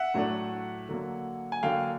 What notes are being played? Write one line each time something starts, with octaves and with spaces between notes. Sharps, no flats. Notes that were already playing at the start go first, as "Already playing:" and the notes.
Already playing: E5 F#5
A2 F#3 A3 D4
D3 F#3 A#3
G#5
D3 F#3 A#3 F5 G5